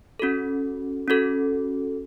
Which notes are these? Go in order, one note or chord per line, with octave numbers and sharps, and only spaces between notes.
C#4 F#4 A4
C#4 F#4 A4